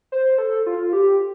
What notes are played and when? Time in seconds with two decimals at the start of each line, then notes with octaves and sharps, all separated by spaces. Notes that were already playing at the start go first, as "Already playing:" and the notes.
0.12 C5
0.38 A4
0.66 F4
0.93 G4